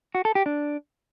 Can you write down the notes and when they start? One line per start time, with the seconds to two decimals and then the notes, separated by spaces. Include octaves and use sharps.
0.15 F#4
0.25 A4
0.35 G4
0.46 D4